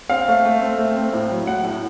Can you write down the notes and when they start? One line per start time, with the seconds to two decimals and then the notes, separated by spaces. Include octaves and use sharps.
0.10 C4 F5
0.28 A3
0.45 A3
0.62 C4
0.78 A3
0.96 C4
1.13 A2
1.31 F#3
1.47 A2 F#5
1.65 A2